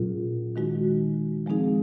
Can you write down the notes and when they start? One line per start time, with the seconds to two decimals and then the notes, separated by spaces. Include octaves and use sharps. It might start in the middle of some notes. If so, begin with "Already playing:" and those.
Already playing: A#2 F#3 C#4 F4 G#4
0.56 D#3 G#3 D#4 F#4
1.46 F3 G#3 C4 D#4 G#4